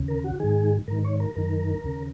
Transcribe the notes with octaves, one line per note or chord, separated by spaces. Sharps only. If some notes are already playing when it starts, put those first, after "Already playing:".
Already playing: D#2 C#3
A#4
F#4
G#2 D#3 G#4
G#2 D#3 A#4
C#5
A#4
F#2 D#3 A#4
D#2 C#3